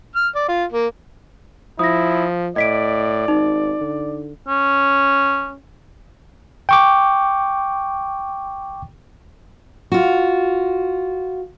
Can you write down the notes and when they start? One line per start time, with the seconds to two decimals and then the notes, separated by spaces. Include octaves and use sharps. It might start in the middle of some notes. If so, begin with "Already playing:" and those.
0.16 F6
0.35 D5
0.48 F4
0.72 A#3
1.79 F3 E4 D#6 A#6
2.56 A2 D5 D#5 B6 D7
3.28 G#1 D#4
3.81 D3
4.49 C#4
6.69 G5 C#6 D6
9.92 F4 F#4